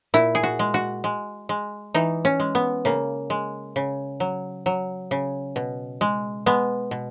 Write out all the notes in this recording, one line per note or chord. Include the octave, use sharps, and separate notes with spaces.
A#2 E4
G#4
F#4
G#3
F#4
G#3
G#3
E3 D#4
C#4
G#3
B3
C#3 A#3
G#3
C#3
F#3
F#3
C#3
B2
G#3
G#3 B3
B2